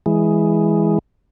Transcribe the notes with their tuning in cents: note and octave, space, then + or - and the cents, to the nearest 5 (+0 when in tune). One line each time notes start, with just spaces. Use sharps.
E3 +0 G#3 +0